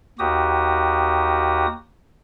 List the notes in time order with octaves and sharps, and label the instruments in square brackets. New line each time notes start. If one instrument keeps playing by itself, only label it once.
[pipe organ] D#2 F#4 G4 D#6